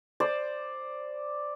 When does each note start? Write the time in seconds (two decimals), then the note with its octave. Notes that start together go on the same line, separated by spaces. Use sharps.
0.20 C5 D5